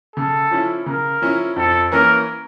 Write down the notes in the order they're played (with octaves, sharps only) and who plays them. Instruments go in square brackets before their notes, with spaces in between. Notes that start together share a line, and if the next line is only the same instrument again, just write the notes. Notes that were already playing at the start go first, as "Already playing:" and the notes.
[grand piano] C#3 [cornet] A4
[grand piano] F3 C#4 E4
[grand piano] C#3 [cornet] A#4
[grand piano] F3 C#4 E4
[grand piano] F2 [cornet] A4
[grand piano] E3 A#3 C#4 E4 [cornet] A#4